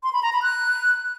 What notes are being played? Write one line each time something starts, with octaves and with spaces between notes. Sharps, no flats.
C6
B5
A#5
B5
F#6